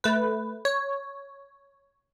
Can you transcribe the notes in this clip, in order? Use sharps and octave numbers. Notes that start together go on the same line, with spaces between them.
A3 B4
C#5